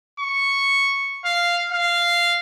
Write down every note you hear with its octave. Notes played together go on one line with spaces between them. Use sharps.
C#6
F5
F5